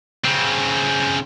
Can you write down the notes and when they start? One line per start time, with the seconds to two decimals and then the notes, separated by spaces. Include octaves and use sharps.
0.25 C#3 C4